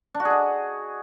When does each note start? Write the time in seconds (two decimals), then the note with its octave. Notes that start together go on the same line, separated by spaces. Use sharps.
0.14 D4
0.20 F#4
0.25 G#4
0.30 D#5